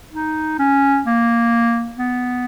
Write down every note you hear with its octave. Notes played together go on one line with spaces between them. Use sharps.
D#4
C#4
A#3
B3